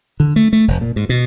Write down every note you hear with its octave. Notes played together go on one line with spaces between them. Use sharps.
D3
A3
A3
F1
A#2
G#2
B2